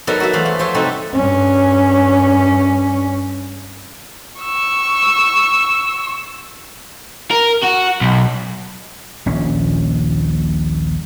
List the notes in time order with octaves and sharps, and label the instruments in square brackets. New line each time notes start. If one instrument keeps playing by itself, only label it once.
[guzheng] F#3 B3 D#4 A4 A#4 D5
F#4 E5
E2 A3 C5 F5 B5
A3
F3 C5 C#5 E5
C3 G3 D#4 F#4 A4
[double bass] G2 C#4
[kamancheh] C#6 E6
[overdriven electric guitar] A#4
F#4
B1
[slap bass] D#1 A#1 C#4